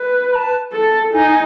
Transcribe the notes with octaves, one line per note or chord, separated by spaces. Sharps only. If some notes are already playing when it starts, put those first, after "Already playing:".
Already playing: B4
B5
A5
A4
D#4 G#5